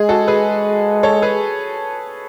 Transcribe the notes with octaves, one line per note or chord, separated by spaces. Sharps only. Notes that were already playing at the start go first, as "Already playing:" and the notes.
Already playing: G#3 G#4
F#4 A4
G#4 B4
A4 C#5
G#4 B4